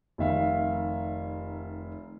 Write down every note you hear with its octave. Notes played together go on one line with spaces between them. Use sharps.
F1 D#3 E5 F5